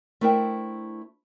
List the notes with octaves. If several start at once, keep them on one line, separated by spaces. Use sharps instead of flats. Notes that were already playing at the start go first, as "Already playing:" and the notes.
A3 D4 E4 A#4 C5 G5